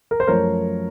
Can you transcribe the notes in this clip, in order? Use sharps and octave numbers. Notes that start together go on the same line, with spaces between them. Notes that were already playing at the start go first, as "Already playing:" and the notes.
A#4
C5
F#2 F3 A3 A#4 C#5